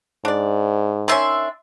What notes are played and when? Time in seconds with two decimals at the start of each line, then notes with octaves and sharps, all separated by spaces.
0.25 G#2 D4 D5
1.08 D#3 C#4 D4 E5 C6